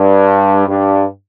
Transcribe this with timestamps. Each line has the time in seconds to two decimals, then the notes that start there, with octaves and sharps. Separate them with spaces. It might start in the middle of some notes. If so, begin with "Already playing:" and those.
Already playing: G2
0.67 G2